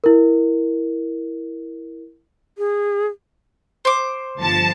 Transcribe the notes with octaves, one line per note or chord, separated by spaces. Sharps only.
E4 A#4
G#4
C5 D6
G1 F3 A5